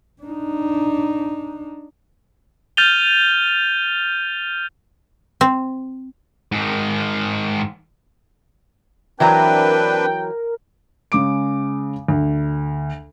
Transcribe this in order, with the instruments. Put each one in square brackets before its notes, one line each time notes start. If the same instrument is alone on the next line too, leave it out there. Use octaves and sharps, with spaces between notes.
[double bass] D4 D#4
[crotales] F6 G6 A6 D#7 F7 G7
[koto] C4
[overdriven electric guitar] G#2 D#3
[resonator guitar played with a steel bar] E3 F#3 A#5 [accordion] C4 D4 B4 [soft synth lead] A#4 [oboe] G5
[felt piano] C#3 G#3 D6 D7
D2